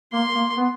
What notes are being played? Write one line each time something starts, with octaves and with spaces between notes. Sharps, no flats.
A#3 C6
A#3
B3